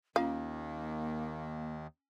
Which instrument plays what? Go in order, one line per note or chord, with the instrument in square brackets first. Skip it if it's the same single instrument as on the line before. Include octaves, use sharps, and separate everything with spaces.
[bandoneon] D#2 D#3 [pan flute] A#3 [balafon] C#4 F4 [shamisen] F5